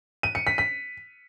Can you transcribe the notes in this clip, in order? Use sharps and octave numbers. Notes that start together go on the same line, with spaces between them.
D#7
C#7
B6
B6